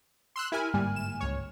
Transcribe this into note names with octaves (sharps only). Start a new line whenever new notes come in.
C6 E6 F#6
E4 G4 A#4 G#5 F6
G1 G#2 G3 A#3 G#5
E7
C#2 C#5